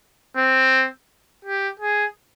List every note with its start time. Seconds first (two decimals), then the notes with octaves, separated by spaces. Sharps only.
0.37 C4
1.45 G4
1.80 G#4